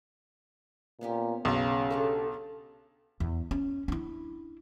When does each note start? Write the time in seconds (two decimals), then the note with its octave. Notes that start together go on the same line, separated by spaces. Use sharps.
1.01 A#2 B3 C#4 G4
1.45 B1 C#3
1.91 D4 G4 A4
3.20 E2
3.51 C#4
3.88 D4 E4